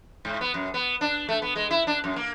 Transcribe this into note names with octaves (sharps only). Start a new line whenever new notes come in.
G#2
B3
F#2
B3
D4
A3
B3
G#3
E4
D4
F#2
A#3